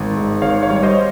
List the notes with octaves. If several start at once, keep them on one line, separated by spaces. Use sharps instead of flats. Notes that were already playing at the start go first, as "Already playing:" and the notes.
Already playing: G#1
G#2
G#1 C#5 F5
C#5 F5
G3
C#5
C5 D#5
C#5